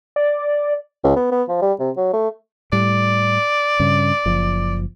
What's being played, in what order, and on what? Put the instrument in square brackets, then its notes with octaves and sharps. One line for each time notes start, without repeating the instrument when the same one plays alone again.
[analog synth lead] D5
[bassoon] C#2
B3
B3
F3
G3
C3
F#3
A3
[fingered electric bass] A2 G3 [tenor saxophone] D5
[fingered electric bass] G2 C#3
F#1 F3